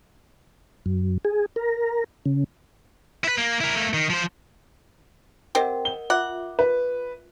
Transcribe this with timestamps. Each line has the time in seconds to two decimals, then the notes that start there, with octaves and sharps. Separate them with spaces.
0.86 F#2
1.25 G#4
1.56 A#4
2.26 C#3
3.24 E4 B4
3.38 A#3
3.61 E4 A#4
3.76 A3 A#3
3.93 D#3
4.10 F3 C5
5.55 C4 G4 A#4 D#5 F#5
5.85 G7
6.10 F4 E5 F#5 D6
6.59 B4